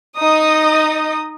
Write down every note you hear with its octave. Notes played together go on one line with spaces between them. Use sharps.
D#4 D#5 D#6